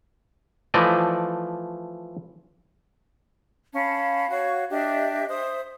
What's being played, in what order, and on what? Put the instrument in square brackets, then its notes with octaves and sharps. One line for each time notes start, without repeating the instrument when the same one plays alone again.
[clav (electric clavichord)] E3 F3 A3 D5 D#5
[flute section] C#4 F5 A5 B5
F#4 C#5 F5 C#6
D4 G4 D#5 E5
C5 E5 D#6